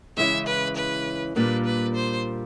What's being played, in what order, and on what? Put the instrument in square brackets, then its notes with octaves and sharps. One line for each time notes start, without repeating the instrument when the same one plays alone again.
[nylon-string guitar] C#3 E3 G#3 C#4 E4 [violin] E5
[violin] B4
B4
[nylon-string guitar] A#2 G3 A#3 D4 [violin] B4
[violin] B4
C5